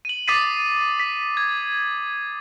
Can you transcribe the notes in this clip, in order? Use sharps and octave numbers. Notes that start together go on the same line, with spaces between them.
D#7 F#7
D6 D#6 A6 B6 C7 D#7
B6
G#6